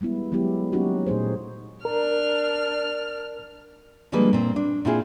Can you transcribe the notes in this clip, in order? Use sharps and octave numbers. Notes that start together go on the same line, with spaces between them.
G3 G#3 B3 E4
F#3 G#3 B3 E4 G4
F#3 A#3 C#4 D#4 F#4 G4
A#2 A3 D#4 G#4 C5
D4 A#4 F6
D3 F3 G3 G#3 A#3 B4
A#2 C4
D4
A#2 C4 E4 F4 G#4